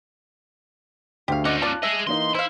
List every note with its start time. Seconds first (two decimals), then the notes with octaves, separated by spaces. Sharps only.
1.28 D2 D3 A3 G4 F5
1.45 C#4 D#4 D5 D#5 F#5
1.62 F4 D5 A5 D6 F#6
1.83 G#4 D#5 E5
2.07 E3 A#3 D#4 C6
2.35 E4 C5 F5 E6